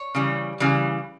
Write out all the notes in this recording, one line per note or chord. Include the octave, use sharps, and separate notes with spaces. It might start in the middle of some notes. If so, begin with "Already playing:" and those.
Already playing: C#5
C#3 E3 G3
C#3 E3 G3